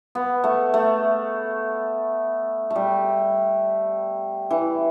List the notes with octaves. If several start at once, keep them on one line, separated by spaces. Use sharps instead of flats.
B3
A3
A3
A3
G3
E3